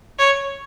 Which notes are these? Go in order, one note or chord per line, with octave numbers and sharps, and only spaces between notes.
C#5